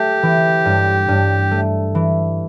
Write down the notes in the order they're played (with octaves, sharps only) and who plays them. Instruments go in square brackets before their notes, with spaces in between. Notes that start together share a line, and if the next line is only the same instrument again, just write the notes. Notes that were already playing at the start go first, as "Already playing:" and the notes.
Already playing: [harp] A3 [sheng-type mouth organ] G4
[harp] E3
G2
G2
A3
E3